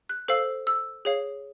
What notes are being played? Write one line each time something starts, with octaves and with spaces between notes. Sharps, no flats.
F#6
A4 C5 F5 E6
E6
G#4 C#5 F5